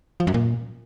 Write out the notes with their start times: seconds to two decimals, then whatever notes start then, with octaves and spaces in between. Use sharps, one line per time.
0.20 F3
0.27 F#2
0.34 A#2